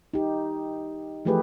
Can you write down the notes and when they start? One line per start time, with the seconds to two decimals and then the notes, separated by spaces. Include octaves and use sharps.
0.14 D#4 G4
1.25 E3 F3 A3 G4 G#4 B4